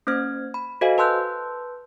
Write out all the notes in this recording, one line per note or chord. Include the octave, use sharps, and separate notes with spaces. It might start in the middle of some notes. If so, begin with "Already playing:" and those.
A#3 C#4 C5 F6 G#6
B5
F#4 A4 C5 D#5 F5 G#5
B4 A5 C6 E6 F#6 G6